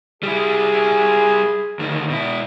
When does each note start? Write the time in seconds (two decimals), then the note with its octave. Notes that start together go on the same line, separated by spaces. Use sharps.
0.23 G3 E4 G#4
1.79 D2 D#3
2.10 B2 E4